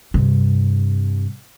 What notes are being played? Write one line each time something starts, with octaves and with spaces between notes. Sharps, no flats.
G2 C3